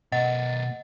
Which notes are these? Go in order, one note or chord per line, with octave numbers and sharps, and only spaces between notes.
B2 A#4 D#5 F#5 A6